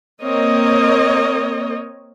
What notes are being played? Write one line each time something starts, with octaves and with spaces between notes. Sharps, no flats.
A#3 C4 A#4 C#5 D#5